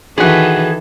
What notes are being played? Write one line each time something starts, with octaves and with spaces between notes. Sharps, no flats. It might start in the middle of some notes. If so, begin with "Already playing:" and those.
D#3 E3 F#4 G#4 A4